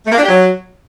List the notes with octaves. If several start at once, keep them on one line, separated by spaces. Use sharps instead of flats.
A3
A#3
D4
G4
F#3